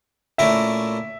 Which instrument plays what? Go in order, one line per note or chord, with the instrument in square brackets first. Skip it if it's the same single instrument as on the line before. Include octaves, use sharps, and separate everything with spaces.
[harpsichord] A#2 A3 C#4 E4 A#4 [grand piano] E5